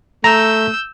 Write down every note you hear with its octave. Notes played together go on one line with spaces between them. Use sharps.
A3 A#5 E6 G6